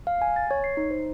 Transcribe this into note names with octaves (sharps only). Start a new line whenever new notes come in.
F5
G#5
A6
C#5
C7
D#4
C5